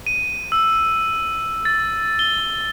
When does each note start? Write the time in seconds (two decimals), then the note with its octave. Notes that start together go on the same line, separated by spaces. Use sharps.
0.07 D#7
0.52 E6
1.65 A6
2.19 G7